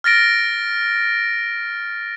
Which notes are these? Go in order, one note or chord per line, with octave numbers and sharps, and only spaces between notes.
F6 A6 A#6 D7